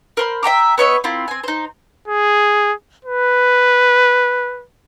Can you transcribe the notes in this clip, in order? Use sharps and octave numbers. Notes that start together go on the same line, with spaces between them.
A#4 C5 B5
E5 G5 A#5 D6
B3 C#5 D#5 E5
C4 E4 F4 A#4
C4 G#5
D#4 C5
G#4
B4